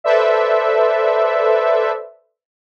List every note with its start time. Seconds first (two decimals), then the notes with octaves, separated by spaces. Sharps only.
0.04 A4 B4 C5 D5 E5